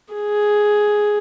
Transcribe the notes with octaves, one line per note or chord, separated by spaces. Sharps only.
G#4